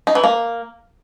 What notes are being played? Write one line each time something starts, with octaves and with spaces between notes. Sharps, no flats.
D#4
E3
A#3